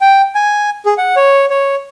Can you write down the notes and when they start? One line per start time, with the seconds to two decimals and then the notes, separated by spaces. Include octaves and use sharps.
0.01 G5
0.35 G#5
0.86 G#4
0.98 F#5
1.16 C#5
1.50 C#5